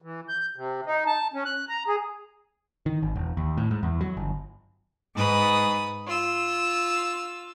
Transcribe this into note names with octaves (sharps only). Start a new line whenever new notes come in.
E3
G6
C3
D#4
A5
C#4
F#6
A#5
G#4
D#3
G#1
E1
D#2
A2
G#2
E2
F#3
G1
G#2 B4 D#6
F4 E6